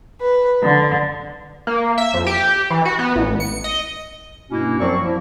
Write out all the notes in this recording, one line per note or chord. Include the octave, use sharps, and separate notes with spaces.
B4
D3
A#3
E5
F2
G4
E3
F#4
B3
A1
C#7
D#5
G2 B2 A#3 C#4 E4 F#4
F#2 F3 F#3 C4 D5 C#6
F3 A#3 E4